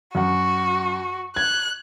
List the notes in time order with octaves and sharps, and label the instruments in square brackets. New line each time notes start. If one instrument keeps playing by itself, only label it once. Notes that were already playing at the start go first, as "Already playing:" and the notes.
[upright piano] F#2 F#5 [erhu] F#4
[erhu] F#6 [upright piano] G#6